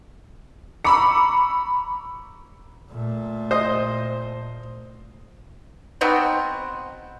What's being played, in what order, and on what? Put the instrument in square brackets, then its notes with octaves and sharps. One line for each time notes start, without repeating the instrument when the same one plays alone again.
[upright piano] A#5 B5 E6 [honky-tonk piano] C#6 D6 C#7
[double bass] A#2 A3
[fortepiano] C5 D#5
[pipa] B3 C4 D#4 F#4